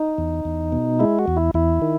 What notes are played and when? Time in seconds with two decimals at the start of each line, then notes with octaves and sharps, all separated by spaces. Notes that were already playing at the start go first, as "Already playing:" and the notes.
Already playing: D#4
0.18 E2
0.45 E2
0.72 B2
0.99 G#3 E4
1.19 F#4
1.28 E2
1.37 E4
1.54 E2 E4
1.82 D#3